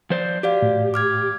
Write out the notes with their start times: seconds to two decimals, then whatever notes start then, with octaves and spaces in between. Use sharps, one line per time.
0.10 F3 C5 D5
0.43 F#4 G4 D5 F5
0.62 A2
0.94 D6 F6 G#6